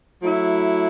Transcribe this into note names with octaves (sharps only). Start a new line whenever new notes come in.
F#3 A3 E4